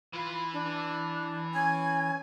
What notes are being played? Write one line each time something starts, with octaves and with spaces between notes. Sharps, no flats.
E3 F4 B4
D4
C#4 G#5 G#6